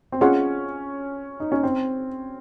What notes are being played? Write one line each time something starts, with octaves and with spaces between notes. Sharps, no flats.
C4
C#4 F4 G#4 D#5 F#5 C6
D#4
C#4
C4